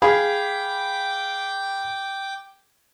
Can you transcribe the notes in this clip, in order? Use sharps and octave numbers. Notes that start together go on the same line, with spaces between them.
G#4 F5 G5 B5 D6 G#6